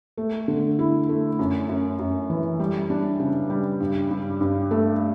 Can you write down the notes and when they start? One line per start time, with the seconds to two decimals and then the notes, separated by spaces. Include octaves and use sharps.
0.18 A3
0.48 D3
0.79 E4
1.09 A3
1.39 F#2
1.69 F#2
1.99 F#2
2.30 E3
2.60 G3
2.90 D4
3.20 C#3
3.50 G3
3.80 G2
4.11 G2
4.41 G2
4.71 A3